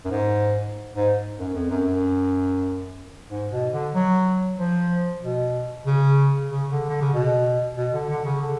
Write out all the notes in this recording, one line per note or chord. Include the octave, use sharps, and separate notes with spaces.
F#2
G#2
G#2
F#2
F2
F#2
F#2
G#2
B2
D3
F#3
F3
B2
C#3
C#3
D3
D3
C#3
B2
B2
D3
D3
C#3
D3